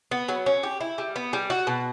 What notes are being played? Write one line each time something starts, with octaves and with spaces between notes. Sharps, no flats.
B3
F#3
C#4
G4
E4
G3
B3
G3
F#4
B2